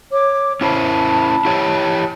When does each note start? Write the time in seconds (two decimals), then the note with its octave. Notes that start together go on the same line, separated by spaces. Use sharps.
0.13 C#5 D6
0.61 C#4 E4 C5 A5 B5
1.45 E4 G4 C#5